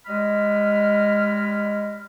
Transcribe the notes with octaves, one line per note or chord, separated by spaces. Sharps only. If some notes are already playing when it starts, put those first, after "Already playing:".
G3 G#3 D#5 B5 F6